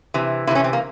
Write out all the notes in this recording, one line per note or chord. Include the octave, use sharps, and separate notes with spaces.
C3 E3
C3 E3 C#4 E4
C4
A#3